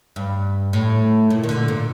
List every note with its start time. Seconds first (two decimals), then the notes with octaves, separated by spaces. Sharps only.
0.16 G2
0.73 A2
1.30 A#2
1.44 D#3
1.49 D3
1.68 A#2